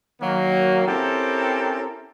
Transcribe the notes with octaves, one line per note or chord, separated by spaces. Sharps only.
D#3 F#3 A#3
C4 C#4 E4 G4 A4 A#4